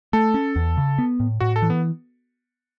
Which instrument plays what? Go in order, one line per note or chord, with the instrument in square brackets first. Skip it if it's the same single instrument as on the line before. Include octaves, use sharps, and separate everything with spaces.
[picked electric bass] A3 [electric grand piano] A4
[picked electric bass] C#4
E2
C#3
B3
A2
[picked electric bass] A2 [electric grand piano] F#4
[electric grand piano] A4
[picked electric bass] E3
[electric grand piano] B3